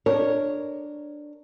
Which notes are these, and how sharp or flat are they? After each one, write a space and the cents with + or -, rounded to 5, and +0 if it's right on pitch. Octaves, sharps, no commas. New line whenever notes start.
D4 +10 A#4 +0 C#5 +0